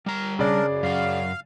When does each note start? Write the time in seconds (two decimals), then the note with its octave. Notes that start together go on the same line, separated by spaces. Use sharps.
0.06 G3 A#4 A#5
0.39 C#3 D4 A#4 D5
0.68 F#2
0.83 F#2 F#4 F5